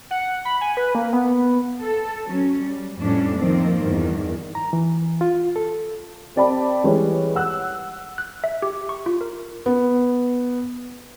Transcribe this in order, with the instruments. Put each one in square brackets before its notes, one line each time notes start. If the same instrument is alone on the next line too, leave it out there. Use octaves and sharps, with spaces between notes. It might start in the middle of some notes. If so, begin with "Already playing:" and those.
[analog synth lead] F#5
B5
G#5
B4
A#3
B3
[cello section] A4
F#3 C#4
G3
F2 A2 G3 A3 C#4 D4
D#3 F3 A#3 C4
E2 G2 D#3
[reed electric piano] A#5
E3
F4
A4
[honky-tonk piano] C4 G4 D5 A5 B5
E3 G3 G#3 B4 C#5
F#5 E6 F#6
[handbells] F#6
E5
G4
C#6
F4
A#4
[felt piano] B3